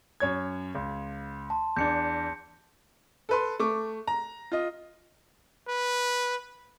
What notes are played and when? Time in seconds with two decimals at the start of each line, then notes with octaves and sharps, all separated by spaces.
0.20 F#2 C#5 G#6
0.75 C#2
1.50 A5 C6
1.76 E2 D4 G6 C#7
3.29 A4 B4 C6
3.60 A3 C#6 D6
4.07 A#5
4.52 F4 D#5
5.68 B4